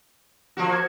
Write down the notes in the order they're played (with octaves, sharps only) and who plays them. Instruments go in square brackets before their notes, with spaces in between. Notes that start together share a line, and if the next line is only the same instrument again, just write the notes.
[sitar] F3 A#3 F#4
[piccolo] G#6